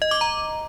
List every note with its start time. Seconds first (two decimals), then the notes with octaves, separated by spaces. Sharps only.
0.02 D#5
0.11 D6
0.21 A#5